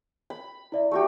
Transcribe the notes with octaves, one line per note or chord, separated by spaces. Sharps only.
B5
E4 D5 E5
A3 F#4 G4